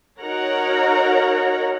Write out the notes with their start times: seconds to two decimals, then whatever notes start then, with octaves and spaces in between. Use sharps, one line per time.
0.21 D#4 F#4 A#4 C#5 F#5 A#5